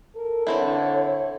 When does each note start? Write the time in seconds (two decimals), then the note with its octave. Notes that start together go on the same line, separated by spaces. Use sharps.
0.16 A4 A#4
0.47 D3 E3 C4 E4 C#5